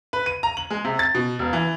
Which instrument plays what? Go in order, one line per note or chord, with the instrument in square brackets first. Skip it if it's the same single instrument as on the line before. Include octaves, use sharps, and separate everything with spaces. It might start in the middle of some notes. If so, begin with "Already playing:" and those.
[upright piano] B4
D#7
A#5
F#7
G#3
C3
A6
B2
E1
E3